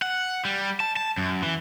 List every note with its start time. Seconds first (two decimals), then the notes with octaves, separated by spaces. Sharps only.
0.02 F#5
0.45 G3
0.80 A5
0.96 A5
1.18 F#2
1.43 E3